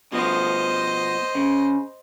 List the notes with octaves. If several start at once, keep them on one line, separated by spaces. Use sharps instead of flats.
B2 F3 B3 C5 D#5
C#3